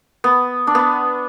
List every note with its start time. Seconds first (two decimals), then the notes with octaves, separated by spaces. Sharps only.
0.24 B3
0.67 D4
0.75 B3